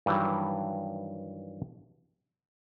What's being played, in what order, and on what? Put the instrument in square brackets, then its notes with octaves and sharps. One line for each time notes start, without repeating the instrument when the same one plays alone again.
[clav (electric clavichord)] G2 D#3 E3 F#3 G3